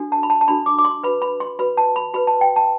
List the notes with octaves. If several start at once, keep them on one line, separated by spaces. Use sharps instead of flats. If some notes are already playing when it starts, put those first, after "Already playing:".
Already playing: D4 F#4 A4
A5
B5
A5
A5
D4 F#4 A4 B5
D6
D6
C6
F#4 B4 B5
B5
C6
F#4 B4 B5
A5
B5
F#4 B4 B5
A5
G5
A5